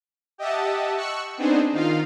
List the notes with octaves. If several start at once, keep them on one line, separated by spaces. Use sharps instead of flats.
G4 D#5 E5 F#5 A5
C#6 E6 F#6 C#7
B3 C4 D4 D#4 G#4 C5
D#3 D#4 F4 F5